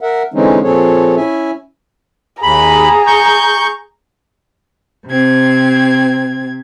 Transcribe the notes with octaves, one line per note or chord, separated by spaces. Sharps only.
A#4 E5 F#5
D3 E3 G#3 C4 C#4 D#4
A#2 F3 C4 G#4 A4 C#5
C#4 E4 E5 G#5
D#2 G#4 A#5 B5
C#6 G6
C3 C4 G#6